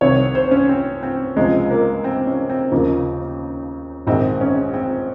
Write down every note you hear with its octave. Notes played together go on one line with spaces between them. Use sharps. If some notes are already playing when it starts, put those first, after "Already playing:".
C2 C3 D#3 C#5
C5
C#4
C4
C4
C#2 C3 F3 G#3
A#3
C4
C#4
C4
D#2 C#3 F3 A#3
A#1 G#2 D#3 C4
C#4
C4